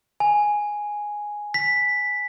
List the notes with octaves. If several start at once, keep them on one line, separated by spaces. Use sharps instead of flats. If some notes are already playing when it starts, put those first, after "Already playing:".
G#5
B6